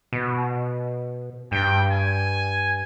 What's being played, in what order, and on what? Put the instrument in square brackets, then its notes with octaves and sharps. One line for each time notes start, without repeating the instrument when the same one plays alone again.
[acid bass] B2
[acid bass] G2 [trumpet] G5
[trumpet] G#5